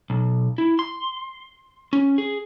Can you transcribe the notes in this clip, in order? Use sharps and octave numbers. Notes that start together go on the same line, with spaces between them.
B1
E4
C6
C#4
G#4